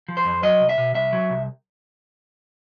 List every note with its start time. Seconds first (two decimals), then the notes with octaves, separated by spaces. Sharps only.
0.08 F3
0.17 C5
0.25 F2
0.43 F#3 D#5
0.60 C2
0.69 E5
0.78 B2
0.95 C2 E5
1.13 F#3
1.30 C2